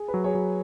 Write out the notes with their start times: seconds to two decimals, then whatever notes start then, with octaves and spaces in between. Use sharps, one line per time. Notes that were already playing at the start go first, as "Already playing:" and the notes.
Already playing: G#4
0.08 B4
0.14 F#3
0.24 G#4 C#5
0.35 F#3